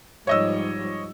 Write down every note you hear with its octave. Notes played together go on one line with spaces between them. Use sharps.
G#2 F3 G3 C#5 D#5 E6